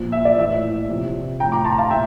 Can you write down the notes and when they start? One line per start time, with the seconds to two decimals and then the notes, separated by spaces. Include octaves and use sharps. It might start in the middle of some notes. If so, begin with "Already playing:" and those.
Already playing: A#2 F3
0.12 E5
0.25 D5
0.38 A2 E3 E5
0.89 C3 F3
1.40 A2 F3 G5 A#5
1.52 A#5 D6
1.65 A5 C6
1.72 A#5
1.78 F5 A5
1.91 A#2 E5 G5